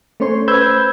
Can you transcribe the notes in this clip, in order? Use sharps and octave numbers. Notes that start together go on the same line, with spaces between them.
A3 C#4 C5 C#5 C6
B4 C5 B5 E6 G6 G#6